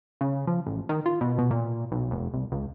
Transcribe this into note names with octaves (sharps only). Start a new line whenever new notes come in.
C#3
F3
A1
D#3
F4
B2
B2
A#2
B1
F1
C2
C#2